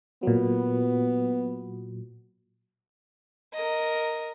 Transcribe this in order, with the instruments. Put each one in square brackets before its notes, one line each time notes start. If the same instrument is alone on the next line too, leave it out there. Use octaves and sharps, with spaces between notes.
[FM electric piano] A#2 F#3 [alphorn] B3
[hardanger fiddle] A#4 D#5